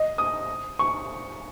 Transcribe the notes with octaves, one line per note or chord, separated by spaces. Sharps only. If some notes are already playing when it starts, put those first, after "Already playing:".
Already playing: D#5
D#6
C#6